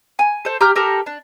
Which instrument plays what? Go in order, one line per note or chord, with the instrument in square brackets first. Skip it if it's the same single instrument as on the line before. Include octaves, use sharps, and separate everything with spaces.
[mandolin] G#5
A4 C5
G4 A#5 F6 G6
G4 A4 A#4
D4